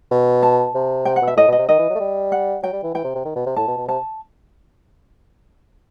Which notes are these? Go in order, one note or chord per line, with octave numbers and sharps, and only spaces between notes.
B2
A5
C3
C3 G5
F#5
B2
E5
A2 D#5
B2
D#5
C3
D#3 D#5
E3
F#3
A3
G3
F#5
F#3 G5
G3
E3
E3 G5
C3
C3
D#3
B2
C3
A2 A5
B2
B2
C3 A5